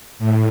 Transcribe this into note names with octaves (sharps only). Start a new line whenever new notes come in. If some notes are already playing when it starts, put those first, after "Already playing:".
A2